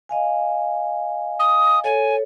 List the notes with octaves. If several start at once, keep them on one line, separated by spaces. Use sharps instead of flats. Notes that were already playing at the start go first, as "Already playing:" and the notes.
D#5 F5 G#5
D#6
A4 C#5 G#5